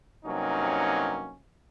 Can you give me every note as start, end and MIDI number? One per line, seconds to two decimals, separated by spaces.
0.25 1.35 43
0.25 1.35 48
0.25 1.35 54
0.25 1.35 58
0.25 1.35 61
0.25 1.35 63